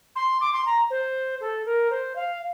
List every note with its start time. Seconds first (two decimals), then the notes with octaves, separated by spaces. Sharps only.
0.16 C6
0.41 D6
0.53 C6
0.66 A#5
0.90 C5
1.41 A4
1.65 A#4
1.90 C5
2.16 F5